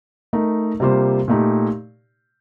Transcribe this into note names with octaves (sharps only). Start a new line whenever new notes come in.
A3 D#4 A#4
C3 G3 A#3 F4 C5
A#2 A3 D#4 G4